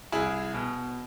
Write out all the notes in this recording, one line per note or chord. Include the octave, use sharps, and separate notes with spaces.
C2 E4 G#4
B2